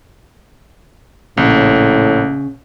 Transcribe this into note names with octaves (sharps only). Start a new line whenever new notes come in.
A#1 A2 C#3